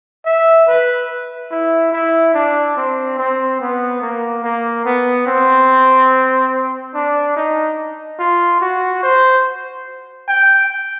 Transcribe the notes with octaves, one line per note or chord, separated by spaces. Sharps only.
E5
B4
E4
E4
D4
C4
C4
B3
A#3
A#3
B3
C4
D4
D#4
F4
F#4
C5
G5